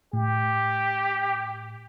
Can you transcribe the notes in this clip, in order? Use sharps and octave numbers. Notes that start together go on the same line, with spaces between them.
A2 G4